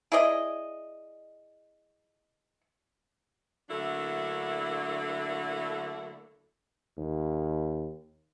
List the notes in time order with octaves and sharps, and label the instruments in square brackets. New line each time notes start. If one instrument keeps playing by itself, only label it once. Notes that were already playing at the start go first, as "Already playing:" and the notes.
[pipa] E4 G#4 D5 D#5
[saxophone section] D3 F#3 A3 A#3 D4 E4
[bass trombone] D#2